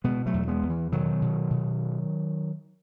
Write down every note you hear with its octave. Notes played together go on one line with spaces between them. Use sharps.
B2 G#3 B3
F#3 A3
E2
G#3 B3
E2
E3
B2 D#3 F#3
B2
B2